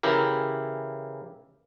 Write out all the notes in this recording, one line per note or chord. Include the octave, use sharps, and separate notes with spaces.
C#3 E3 E4 G4 A#4